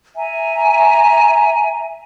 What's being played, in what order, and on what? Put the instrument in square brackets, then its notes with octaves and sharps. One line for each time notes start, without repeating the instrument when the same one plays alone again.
[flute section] E5 G#5 A#5